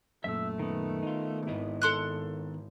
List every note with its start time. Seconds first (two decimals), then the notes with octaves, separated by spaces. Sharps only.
0.24 F#2 A#2 A3 E5 E6
0.59 D#3 B3
1.03 D#4 F4
1.47 G#1 E4 B4 D#5
1.82 A4 C6 F#6